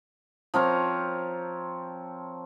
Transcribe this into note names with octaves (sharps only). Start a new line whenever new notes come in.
F3 C4 A#4 C#5